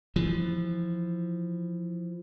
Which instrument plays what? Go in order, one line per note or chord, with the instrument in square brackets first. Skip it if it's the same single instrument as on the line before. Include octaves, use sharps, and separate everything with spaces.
[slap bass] E3 F3